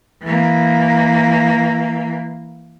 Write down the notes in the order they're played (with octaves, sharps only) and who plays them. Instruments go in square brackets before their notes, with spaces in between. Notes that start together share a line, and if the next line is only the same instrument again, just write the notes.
[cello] E3 A#3